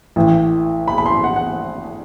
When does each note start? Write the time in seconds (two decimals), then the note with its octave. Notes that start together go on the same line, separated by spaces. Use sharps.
0.16 A1 A2 E3
0.88 B5
0.98 B5
1.06 C6
1.24 F#5
1.36 F#5